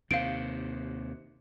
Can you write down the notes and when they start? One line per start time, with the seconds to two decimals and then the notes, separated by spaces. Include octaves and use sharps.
0.11 D#2 C3 F5 D7